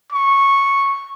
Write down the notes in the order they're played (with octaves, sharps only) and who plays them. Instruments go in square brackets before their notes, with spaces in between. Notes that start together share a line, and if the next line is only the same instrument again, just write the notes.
[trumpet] C#6